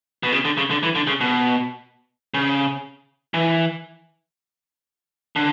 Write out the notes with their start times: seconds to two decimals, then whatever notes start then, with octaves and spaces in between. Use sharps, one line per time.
0.23 B2
0.32 C#3
0.45 D3
0.57 C#3
0.70 D3
0.83 E3
0.95 D3
1.07 C#3
1.21 B2
2.34 C#3
3.34 E3
5.36 D3